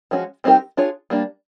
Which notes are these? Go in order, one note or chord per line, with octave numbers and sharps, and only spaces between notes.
F3 G#3 C#4 F#4
G3 C4 D#4 G4 A#4
D4 F4 G#4 C#5
G3 A#3 D4